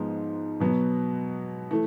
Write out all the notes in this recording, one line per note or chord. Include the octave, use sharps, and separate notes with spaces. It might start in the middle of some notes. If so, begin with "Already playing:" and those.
Already playing: G#2 F3 G#3 B3 D#4
B2 F#3 B3
E3 A3